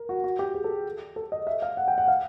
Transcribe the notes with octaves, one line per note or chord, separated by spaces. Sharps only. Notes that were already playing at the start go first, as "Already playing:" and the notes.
Already playing: A#4
F#4
F#4
G4
G#4
A4
A4
D#5
E5
F5
F#5
G5
F#5
F5